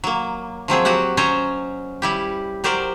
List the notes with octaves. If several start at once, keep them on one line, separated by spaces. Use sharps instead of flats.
F#3 A#3
F3 F#3 C4 G#4
F#3 F#4 G4 F#5
F#3 C#4 C5 C#5 D#5 A#5
G3 E4 G4
F#3 G4 A#4 C5 D5